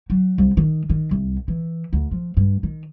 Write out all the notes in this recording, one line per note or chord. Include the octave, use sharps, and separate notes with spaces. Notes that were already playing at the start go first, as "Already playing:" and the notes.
F#3
C2
D#3
D#3
C2
E3
D2
F3
G2
D#3